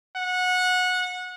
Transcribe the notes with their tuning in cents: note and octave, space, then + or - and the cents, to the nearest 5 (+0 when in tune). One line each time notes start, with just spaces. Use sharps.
F#5 -20